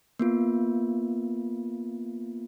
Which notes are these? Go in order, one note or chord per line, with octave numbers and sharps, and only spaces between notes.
A#3 B3 F4